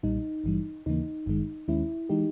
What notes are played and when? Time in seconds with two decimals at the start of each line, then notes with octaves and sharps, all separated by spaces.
0.03 B1 A#2 G3 D#4
0.44 G#1 G2 E3 G3
0.86 D#2 C#3 E3 A#3 D#4
1.26 G#1 G2 D#3 G#3
1.68 D#2 D#3 G#3 C#4 E4
2.09 E3 G#3 D#4 G4